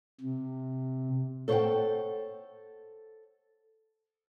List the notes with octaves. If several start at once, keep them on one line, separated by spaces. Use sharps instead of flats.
C3
A4 C5 C#5 E5 F#5 G5